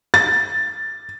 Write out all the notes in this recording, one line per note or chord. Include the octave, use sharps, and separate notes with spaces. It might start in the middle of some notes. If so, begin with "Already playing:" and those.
A6